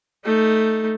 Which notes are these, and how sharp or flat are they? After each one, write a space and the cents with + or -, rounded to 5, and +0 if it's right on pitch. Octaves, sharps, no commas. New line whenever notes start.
A3 +0 D#4 +0